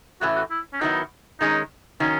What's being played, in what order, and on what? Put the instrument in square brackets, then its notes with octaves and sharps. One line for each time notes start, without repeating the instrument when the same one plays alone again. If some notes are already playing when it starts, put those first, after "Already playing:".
[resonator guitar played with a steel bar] A2 E3 A3 C#4 [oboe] F#4
[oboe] F#4
E4
C#4
[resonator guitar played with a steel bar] D#3 F#3 B3 E4 [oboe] D#4
[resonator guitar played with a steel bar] D#3 G#3 C#4 [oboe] D#4
[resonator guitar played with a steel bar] D#3 F#3 [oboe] C#4